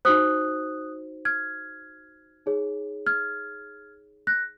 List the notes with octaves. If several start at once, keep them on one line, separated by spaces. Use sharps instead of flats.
D#4 F#4 C5 D#6 F#6
F6 G#6
D#4 G#4 C#5
F6 G#6
F#6 A#6